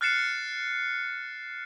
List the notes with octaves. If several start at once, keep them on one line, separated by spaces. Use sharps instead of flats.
F6 F#6 A6 C7 C#7 E7